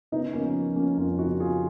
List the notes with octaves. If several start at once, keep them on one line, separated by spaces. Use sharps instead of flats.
C#3 B3 D#4
A#3 C#4
F3
F3
A#3 C#4
F2 C#4 F4
D#4 F#4
C#3
F4 G#4